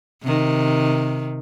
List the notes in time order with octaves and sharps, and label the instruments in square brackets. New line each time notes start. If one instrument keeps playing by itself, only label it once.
[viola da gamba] C3 D#3